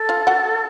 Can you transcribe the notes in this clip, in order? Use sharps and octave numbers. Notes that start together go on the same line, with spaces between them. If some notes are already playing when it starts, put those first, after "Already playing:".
Already playing: A4
F4 F5
F#4 F#5